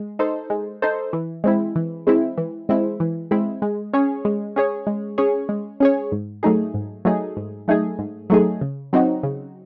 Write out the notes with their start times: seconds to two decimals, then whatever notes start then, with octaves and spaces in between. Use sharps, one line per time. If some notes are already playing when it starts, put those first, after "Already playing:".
Already playing: G#3
0.19 D#4 A4 C5
0.50 G#3
0.82 D#4 A4 C5
1.13 E3
1.44 G#3 C4 E4
1.76 E3
2.07 G#3 C4 E4
2.38 E3
2.69 G#3 C4 E4
3.00 E3
3.31 G#3 C4 E4
3.62 G#3
3.93 C#4 G#4 C#5
4.25 G#3
4.56 C#4 G#4 C#5
4.87 G#3
5.18 C#4 G#4 C#5
5.49 G#3
5.80 C#4 G#4 C#5
6.12 G#2
6.43 F#3 A3 D#4 G#4
6.74 G#2
7.05 F#3 A3 D#4 G#4
7.37 G#2
7.68 F#3 A3 D#4 G#4
7.99 G#2
8.30 F#3 A3 D#4 G#4
8.61 C#3
8.93 F#3 C4 D#4 F#4
9.23 C#3